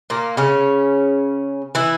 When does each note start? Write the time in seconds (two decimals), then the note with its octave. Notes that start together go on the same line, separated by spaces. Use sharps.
0.10 A#2 A#3
0.37 C#3 C#4
1.75 E3 E4